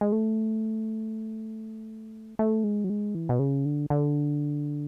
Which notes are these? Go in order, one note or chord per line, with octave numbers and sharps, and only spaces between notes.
G#3
A3
A3
G#3
F#3
G#3
E3
B2
C#3
D3
D3